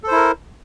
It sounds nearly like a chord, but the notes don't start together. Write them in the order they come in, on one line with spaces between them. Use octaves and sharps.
A4 C5 E4 A#4